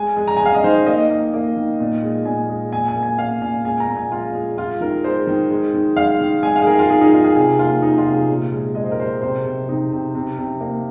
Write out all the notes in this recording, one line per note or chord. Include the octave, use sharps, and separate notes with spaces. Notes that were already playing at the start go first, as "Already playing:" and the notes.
Already playing: G#3 G#5
G#3
A#5
G#3 G#5
F5
D#5
D#3 C5
A#3 D#5
A#3
A#3
D#3
A#2
G#3
A#2 G#5
G#3
A#2 G#5
G#5
A#3
G#5
A#3 F5
A#2 G#5
G#3 G#5
A#5
A#2
G#5
G#3 F4
G#3
G#3 F4
D#3 A#4
G#3 C5
D#3
G#3
D#3
G#3 F5
D#3
G#3 G#5
F5
G#4
D#3 A#4
F4
D#3 G#4
D#4
D#3 F4
G#4
C3 G#4
A#3 F4
A#3 D#4
F4
C3
G#4
A#2
G#3
G#3 D#5
C5
A#4
G#3 C5
C3 C5
C3
C3 D#4
C3
C3
C3
A#3